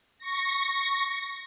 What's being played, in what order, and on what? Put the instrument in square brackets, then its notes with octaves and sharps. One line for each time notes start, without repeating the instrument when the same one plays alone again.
[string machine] C#6 A#6